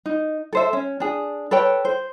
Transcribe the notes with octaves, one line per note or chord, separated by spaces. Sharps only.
D#4
A4 C5 E5
C#4
D4 G#4
A4 B4 C#5 G5
C5